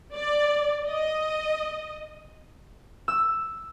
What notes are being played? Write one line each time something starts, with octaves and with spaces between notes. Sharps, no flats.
D5
D#5
E6